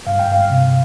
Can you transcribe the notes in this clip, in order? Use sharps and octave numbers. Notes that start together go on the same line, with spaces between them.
G2 F5
G5
G2 F5
C3